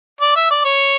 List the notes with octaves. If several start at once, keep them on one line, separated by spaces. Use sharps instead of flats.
D5
E5
D5
C#5